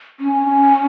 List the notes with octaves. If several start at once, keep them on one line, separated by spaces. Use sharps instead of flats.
C#4